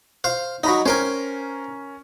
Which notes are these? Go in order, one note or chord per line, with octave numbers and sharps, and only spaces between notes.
C5 F5
F#3 D#4 D#5 A#5 B5
C#4 A#4 C5 G5 G#5 A#5